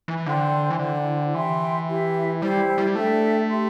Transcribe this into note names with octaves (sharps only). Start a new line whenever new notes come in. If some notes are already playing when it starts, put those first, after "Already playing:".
E3
D3 C5 G5 C6
E3
D3 E4 C5 G5
E3 G4 E5 G5 C6
E4 G4 E5
G3 E4 G4 C5
G3
A3 D4 A4 E5 G5
G4 E5 C6